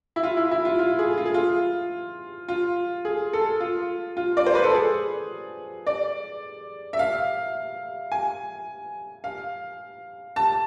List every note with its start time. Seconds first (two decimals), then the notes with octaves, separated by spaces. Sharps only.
0.16 E4
0.23 F4
0.37 E4
0.51 E4
0.65 F4
0.79 F4
0.99 G#4
1.18 F4
1.26 G#4
1.34 F4
2.48 F4
3.05 G#4
3.33 A4
3.60 F4
4.17 F4
4.37 D5
4.46 C5
4.55 B4
4.64 A4
4.74 G#4
5.87 D5
6.93 E5
6.99 F5
8.12 G#5
9.24 F5
10.36 A5